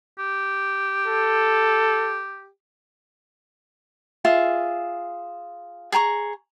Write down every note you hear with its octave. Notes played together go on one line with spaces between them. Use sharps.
G4
A4
F4 G#4 E5
G#4 G#5 A#5 C#6